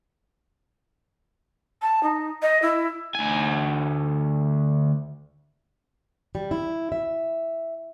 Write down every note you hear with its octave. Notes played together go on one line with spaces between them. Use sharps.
A5
D#4
D#5
E4
D2 G#5
G3
E4
E5